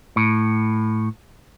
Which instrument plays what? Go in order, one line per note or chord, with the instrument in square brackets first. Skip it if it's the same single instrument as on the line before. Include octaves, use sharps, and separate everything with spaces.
[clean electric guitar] A2